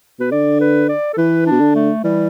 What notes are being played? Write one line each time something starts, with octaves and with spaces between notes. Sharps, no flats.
B2 B4
D3 D5
B4
D5
A4
E3 B4
D4
B2
D3
A3
E3 G3